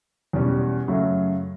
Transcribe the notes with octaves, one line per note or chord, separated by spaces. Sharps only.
E2 B2 G3 C#4
F#2 C#3 F#3 A3